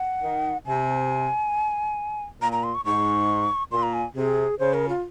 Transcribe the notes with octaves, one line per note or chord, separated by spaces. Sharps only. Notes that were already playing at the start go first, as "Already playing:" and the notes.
Already playing: F#5
D#3
C3 G#5
A#2 A#5
A#5
C6
C#6
G#2 C#6
A#2 C6
A#5
G#5
C3 G#4
C#3 C5
A#4
F4